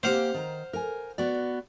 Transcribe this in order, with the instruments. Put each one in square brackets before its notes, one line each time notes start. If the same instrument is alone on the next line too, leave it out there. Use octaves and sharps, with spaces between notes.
[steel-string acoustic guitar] A#3 C4 G4 [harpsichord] C5 F5 F#5
[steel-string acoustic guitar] D#3 A5 A#5
A#4 G#5
B3 F#4 D5